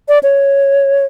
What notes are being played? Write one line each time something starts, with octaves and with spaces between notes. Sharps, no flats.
D5
C#5